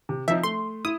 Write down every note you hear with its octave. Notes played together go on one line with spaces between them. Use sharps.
C3
F3 C4 D#4 E5
A3 C6
E4 D#6